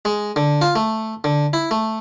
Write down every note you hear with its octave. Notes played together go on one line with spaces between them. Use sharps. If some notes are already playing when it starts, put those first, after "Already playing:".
G#3
D3
F4
A3
D3
E4
A3